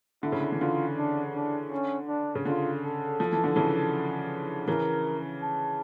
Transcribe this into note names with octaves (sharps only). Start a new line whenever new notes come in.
D3 E4
C#3
D3
E3
D3 F4
D4
D4
C#4
D4
C#3
D3 F4
A4
F3
E3
D3
C#3 E3
C#3 E3 A#4
A5